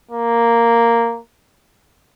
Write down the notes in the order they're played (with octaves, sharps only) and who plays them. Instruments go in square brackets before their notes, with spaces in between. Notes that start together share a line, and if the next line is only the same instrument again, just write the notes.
[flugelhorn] A#3